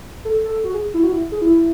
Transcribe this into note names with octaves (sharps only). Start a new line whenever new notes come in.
A4
A4
F#4
G#4
E4
F#4
E4
G#4
E4